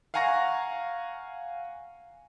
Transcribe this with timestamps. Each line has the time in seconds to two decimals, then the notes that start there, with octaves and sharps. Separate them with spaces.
0.14 F5 F#5 G#5 A#5 C#6 A#6